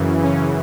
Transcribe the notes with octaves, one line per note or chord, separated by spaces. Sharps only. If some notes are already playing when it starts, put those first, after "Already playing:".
Already playing: F#2 C#3 E3
C#4